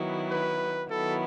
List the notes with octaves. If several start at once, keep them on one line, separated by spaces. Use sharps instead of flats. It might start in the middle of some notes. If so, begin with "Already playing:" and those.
Already playing: D#3 F#3 B3 E4
B4
D#3 F#3 B3 E4 A4